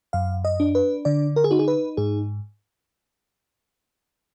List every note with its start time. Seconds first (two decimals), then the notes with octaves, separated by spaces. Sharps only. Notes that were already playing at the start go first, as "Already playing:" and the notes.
0.13 F#2 F5
0.45 D#5
0.60 D4
0.75 B4
1.05 D3 D5
1.36 A#4
1.44 G#4
1.51 D#4 F#4
1.59 G#4
1.68 B4
1.97 G#2 G#4